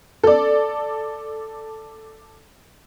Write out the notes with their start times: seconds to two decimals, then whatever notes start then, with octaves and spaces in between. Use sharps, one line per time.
0.23 A4 D5